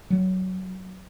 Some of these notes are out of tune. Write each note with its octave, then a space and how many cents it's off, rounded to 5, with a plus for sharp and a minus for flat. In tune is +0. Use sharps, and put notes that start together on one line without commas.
F#3 +10